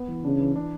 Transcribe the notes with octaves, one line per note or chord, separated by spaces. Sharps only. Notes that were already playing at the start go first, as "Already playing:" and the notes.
Already playing: B3
E3
C#3 D4
E3
D4